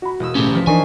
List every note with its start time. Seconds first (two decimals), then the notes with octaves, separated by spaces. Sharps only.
0.02 F#4 B5
0.20 E1 D#6 E6
0.35 A2 C#3 C#4 G4
0.55 F3 B6
0.67 E3 D4 D#4 A#4 G#5 C#6 C7